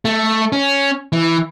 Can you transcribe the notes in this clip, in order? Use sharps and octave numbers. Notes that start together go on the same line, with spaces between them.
A3
C#4
E3